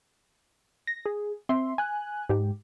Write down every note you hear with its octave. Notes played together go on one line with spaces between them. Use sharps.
A#6
G#4
C4 E5 C6
G#5 F#6
G#2 G4